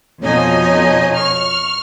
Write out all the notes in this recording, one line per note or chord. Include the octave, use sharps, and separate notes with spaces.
F2 B2 F3 D#4 C#5 D#5 G#5
C#6 F6